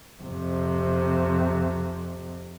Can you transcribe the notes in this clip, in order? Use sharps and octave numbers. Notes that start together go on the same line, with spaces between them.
F2 C3